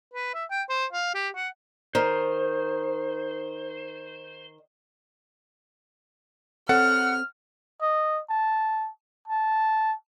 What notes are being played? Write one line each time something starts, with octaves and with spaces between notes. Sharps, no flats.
B4
E5
G5
C5
F5
G4
F#5
D#3 C5
C4 A4 C#5 F#5 F6
D#5
A5
A5